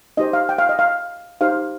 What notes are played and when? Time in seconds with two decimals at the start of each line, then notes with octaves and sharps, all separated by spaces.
0.17 D#4 G4 C5 D#5
0.33 F5
0.49 G5
0.58 F5
0.69 D#5
0.79 F5
1.41 D#4 G4 C5 F5